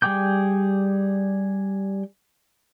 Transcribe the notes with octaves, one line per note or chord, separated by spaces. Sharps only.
G3 G#4 G5 D6 G6